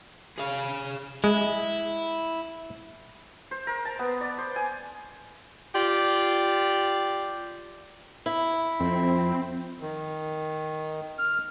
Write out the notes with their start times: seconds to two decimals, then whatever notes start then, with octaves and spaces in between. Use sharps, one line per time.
0.38 G#4 F5
1.24 G#3 E4
3.51 C5
3.67 A#4
3.85 A5
3.99 B3
4.21 D5
4.38 C5
4.56 G#5
5.75 F4 G4 D5
8.26 E4
8.80 F2 C4
9.81 D#3
11.19 F6